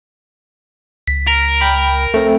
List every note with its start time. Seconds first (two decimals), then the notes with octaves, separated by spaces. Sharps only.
1.08 C#2 B6
1.27 A#4
1.61 G5 B5
2.14 A3 C4